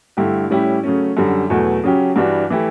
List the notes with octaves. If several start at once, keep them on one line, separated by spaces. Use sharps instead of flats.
G2 D3 A3 E4 G4
A2 G3 C#4 E4 G4
C#3 F#3 A3 C#4
F#2 D3 G3
E2 B2 F#3 A3
C#3 F#3 C#4 G4
G2 E3 G3 D4 F#4
E3 A3 E4 G4